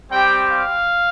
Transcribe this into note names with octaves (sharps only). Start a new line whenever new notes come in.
G3 C4 G4 G5
F5